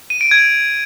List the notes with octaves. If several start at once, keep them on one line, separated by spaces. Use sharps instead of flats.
D#7
D7
G#6